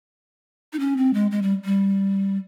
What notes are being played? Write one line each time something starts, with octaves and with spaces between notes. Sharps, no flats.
D#4
C#4
C4
G#3
G#3
G3
G3